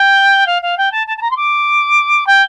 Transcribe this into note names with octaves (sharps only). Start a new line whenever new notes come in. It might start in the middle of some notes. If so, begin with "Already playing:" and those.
Already playing: G5
F5
F5
G5
A5
A5
A5
A#5
C6
D6
G5